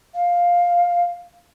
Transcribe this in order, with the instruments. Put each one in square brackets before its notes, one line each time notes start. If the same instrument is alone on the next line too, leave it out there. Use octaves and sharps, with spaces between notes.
[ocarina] F5